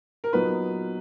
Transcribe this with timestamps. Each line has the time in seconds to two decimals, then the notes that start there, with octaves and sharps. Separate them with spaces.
0.24 A#4
0.33 A#2 F#3 B3 D#4 B4